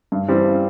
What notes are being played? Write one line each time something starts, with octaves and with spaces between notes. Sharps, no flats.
G2
E3 G3 C4